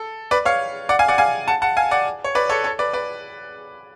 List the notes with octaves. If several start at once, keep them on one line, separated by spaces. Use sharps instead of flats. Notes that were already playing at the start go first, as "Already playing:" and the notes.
Already playing: A4
B4 D5
C#5 F5
D5 F#5
F5 G#5
D5 F#5
F5 G#5
F#5 A5
F#5 A5
F5 G#5
D5 F#5
C#5
B4 D5
A4 C#5
A4 C#5
B4 D5
B4 D5